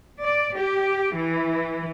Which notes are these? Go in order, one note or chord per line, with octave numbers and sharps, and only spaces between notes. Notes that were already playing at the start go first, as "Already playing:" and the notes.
D5
G4
E3